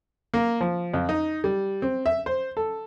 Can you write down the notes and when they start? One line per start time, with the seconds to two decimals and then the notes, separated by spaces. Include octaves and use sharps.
0.34 A#3
0.61 F3
0.94 F2
1.09 D#4
1.44 G3
1.82 C4
2.06 E5
2.26 C5
2.57 A4